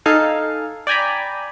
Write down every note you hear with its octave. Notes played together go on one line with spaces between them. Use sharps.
D#4 A4 F5 G#5
D5 G5 G#5 A#5 B5